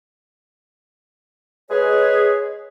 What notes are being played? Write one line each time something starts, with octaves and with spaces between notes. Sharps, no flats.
G#3 G#4 B4 C#5